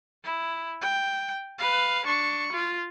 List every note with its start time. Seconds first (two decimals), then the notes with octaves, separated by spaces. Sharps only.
0.24 E4
0.82 G5
1.58 B4 F5
2.06 D4 C#6
2.52 F4